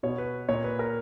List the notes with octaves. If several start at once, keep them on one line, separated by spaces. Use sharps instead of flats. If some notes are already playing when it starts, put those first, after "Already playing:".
B2 C#5
B4
A#2 C#5
B4
A#4